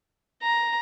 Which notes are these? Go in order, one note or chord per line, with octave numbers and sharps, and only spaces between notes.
A#5